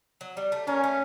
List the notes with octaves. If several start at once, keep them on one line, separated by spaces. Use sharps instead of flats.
F#3
G3
A3
A#3 C#4
A3